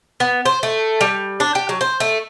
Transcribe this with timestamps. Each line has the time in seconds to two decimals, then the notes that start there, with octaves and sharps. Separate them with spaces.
0.20 B3
0.45 C5
0.63 A3
1.01 G3
1.40 D4
1.55 G4
1.69 F#3
1.81 C5
2.00 A3